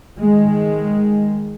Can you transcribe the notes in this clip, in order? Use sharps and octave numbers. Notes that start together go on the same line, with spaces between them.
D#3 G#3